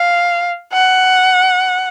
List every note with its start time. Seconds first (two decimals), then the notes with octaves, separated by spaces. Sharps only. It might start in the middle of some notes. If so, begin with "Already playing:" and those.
Already playing: F5
0.73 F#5